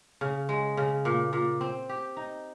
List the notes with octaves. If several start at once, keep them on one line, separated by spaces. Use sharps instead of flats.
C#3
G#3
C#3
A#2
A#2
C4
G4
D#4